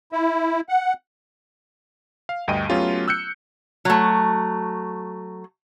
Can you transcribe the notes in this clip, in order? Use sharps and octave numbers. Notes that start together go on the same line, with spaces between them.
E4
F#5
F5
D2 G2 D#5 G5 D#7
F#3 A3 B3 C#4 F4 G4
E6 F#6 G6 C#7
F#3 A3